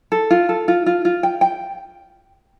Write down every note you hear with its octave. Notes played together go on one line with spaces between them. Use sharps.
A4
F4
A4
F4
F4
F4
G5
G5